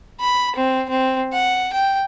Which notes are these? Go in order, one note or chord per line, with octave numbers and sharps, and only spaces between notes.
B5
C4
C4
F#5
G5